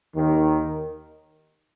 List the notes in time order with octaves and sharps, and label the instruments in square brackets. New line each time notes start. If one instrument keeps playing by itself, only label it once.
[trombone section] D#2 D#3